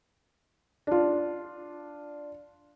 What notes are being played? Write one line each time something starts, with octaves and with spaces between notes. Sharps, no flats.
D4 F4